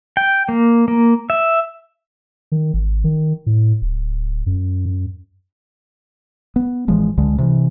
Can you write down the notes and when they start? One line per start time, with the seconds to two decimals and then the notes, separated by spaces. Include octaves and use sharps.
0.17 G5
0.49 A#3
0.88 A#3
1.30 E5
2.52 D#3
2.74 G#1
3.04 D#3
3.46 A2
3.82 D1
4.46 F#2
4.86 F#2
6.56 B3
6.88 A1 E3 F3 G#3
7.17 C#2 D3 G#3
7.38 C3 E3